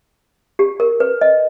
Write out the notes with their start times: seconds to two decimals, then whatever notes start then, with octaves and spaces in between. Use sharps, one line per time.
0.59 G4
0.80 A#4
1.00 B4
1.21 D#5